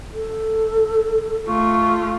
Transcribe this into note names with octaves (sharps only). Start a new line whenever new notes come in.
A4
A3 F4 C#6